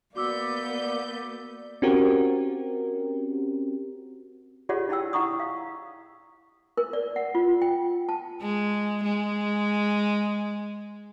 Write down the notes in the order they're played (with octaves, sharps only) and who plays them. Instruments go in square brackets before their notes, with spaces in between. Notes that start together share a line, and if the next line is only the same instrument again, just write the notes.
[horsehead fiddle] A#3 [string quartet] B3 G6 [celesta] F#4 D6 E6 [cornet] D5
[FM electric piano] C4 C#4 F#4 G4 A#4
[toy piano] F4 G4 G#4 C#5 D5 F#5
E4 D5 F#5 G5 E6
E4 F#5 A#5 C#6 D#6
F5
A#4
D5
F#5
F4
G5
A5
[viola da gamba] G#3
G#3